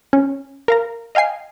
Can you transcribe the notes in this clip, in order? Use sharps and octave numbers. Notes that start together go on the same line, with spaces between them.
C#4
A#4 F5 A#5
D#5 F5 G5 G#5 C7